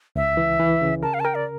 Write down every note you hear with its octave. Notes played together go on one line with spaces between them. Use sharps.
C#2 E5
E3
E3
C#3
A#4 A5
F5
A5
A#4 G5
D5